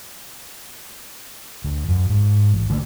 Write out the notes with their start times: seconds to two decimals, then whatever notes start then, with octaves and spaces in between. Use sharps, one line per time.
1.64 D2
1.89 F#2
2.09 G#2
2.53 A1
2.70 D3 A3 A#3